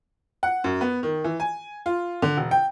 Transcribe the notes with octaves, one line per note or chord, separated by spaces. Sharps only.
F#5
F#2
B3
D#3
E3
G#5
F4
D3
E1
G5